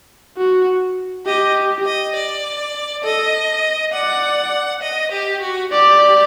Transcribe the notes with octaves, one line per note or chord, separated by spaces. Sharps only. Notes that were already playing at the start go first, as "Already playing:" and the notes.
F#4
G4 D#5
D#5
D5
A4 D#5
D5 F#5
D#5
G4
F#4
G4 D5